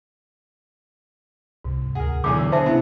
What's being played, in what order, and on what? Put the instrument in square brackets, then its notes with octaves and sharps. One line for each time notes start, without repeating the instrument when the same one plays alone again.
[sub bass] C2 [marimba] G#2 C3
[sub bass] D2 [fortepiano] G#4 A#4 [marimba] F#5
[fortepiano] B1 E2 G#5 [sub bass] D3 [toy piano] D6
[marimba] E6
[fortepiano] B3 D4 G#4 [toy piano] C5 E5 A5
[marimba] C3 C#4 E4 [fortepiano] B3